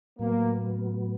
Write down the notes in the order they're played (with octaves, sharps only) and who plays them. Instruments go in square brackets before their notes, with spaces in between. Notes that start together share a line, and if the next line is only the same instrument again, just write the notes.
[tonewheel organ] A2 F#3 B3 [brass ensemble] A#3